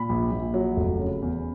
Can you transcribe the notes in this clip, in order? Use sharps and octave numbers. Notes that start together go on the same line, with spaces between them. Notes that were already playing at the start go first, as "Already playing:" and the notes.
Already playing: A#2 B5
A#1
A#1
F#3
F1
C#3
E2